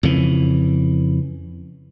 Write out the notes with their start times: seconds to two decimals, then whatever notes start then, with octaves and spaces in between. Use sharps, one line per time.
0.03 F2 C#3 E3